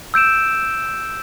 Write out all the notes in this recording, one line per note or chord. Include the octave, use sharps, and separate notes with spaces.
E6 G6 D7 E7